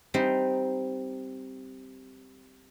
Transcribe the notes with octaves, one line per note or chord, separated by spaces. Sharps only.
G3 C4 D#4